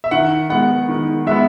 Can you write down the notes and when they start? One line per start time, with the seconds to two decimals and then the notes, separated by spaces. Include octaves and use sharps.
0.04 E5
0.11 D#3 F#5
0.50 G#3 B3 F#5
0.89 D#3
1.27 G#3 B3 E5